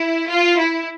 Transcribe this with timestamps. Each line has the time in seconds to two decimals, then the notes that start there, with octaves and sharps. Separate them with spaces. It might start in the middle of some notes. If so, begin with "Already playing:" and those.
Already playing: E4
0.29 F4
0.59 E4